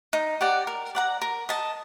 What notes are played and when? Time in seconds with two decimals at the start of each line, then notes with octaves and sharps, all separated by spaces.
0.13 D#4
0.41 G4 D5 F#5
0.67 A#4
0.95 D5 F#5 A#5
1.22 A#4
1.49 D#5 A5